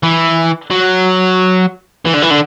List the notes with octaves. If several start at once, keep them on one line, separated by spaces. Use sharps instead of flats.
E3
F#3
E3
D3
E3
D3